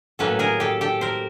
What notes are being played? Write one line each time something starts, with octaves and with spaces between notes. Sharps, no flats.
A2 F#3 A#3 C#4 A4 B4
G#4 A#4
G4 A4
G4 A4
A#4 C5